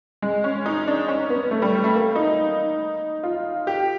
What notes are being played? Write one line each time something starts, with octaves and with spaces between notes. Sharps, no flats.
G#3
C#4
D#4
D4
C#4
B3
A3
G3
A3
A#3
D#4
F4
G4